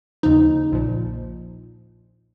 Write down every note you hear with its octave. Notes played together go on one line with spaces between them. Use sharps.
D#2 C#3 F3 D#4
A#1 A#2 F3